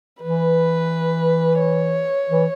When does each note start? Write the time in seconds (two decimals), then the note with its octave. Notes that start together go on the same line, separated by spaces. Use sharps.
0.22 E3 B4
1.61 C#5
2.30 E3